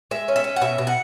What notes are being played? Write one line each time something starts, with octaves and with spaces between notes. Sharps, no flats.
G#3 E5
C#4
E5
C#4
F#5
B2 E5
B2
F#5